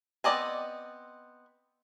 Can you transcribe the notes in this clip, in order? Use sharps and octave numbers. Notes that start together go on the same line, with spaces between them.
B3 C4 D5 D#5 G#5